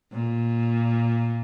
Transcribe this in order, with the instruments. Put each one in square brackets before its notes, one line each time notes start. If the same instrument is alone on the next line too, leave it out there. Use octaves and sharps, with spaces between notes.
[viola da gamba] A#2